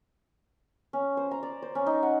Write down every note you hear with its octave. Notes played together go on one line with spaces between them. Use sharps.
C#4
C5
A#5
D5
C5
C#4
D#4
F#5